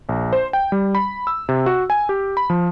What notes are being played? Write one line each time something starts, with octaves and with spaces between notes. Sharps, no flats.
A#1
C5
G5
G3
B5
E6
C3
F#4
G#5
G4
B5
F3